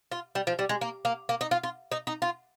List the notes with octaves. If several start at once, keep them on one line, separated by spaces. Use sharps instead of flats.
F4
G3
F3
G3
G#3
A#3
A#3
A#3
D#4
F4
F4
D#4
D#4
F4